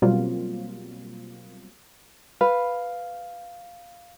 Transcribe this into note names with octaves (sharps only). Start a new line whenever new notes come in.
B2 F#3 G3 A#3 C4 F4
B4 F5